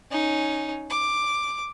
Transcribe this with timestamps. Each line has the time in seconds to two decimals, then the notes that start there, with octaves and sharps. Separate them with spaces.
0.10 C#4 D#4
0.89 D6